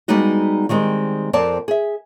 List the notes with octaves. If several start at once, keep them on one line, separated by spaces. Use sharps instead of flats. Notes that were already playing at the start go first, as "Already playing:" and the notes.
G3 G#3 B3 D#4 F#4
D#3 G3 G#3 C4
F2 C4 A#4 D5 A5
G#4 E5